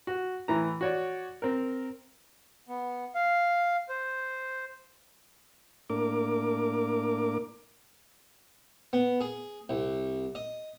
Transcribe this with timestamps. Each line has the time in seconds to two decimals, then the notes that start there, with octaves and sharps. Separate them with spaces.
0.07 F#4
0.48 A2 E3 A#5
0.81 F#4 C#5 D5
1.42 C4 A#4
2.68 B3
3.15 F5
3.89 C5
5.90 A2 A#3 D4 A#4 D6
8.93 B3
9.21 G#4
9.69 C2
10.35 D#5